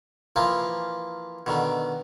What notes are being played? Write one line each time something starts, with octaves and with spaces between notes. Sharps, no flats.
E3 F3 A#3
B2 D3 D#3